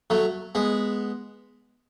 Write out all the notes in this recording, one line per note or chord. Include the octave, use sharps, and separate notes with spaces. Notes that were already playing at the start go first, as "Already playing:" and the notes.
F#3 A3
G#3 B3